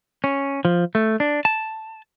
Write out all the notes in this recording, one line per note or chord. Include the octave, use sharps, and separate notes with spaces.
C#4
F3
A3
D4
A5